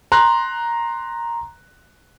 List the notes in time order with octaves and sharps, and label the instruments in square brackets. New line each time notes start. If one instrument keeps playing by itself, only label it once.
[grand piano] A#5 C6 F#6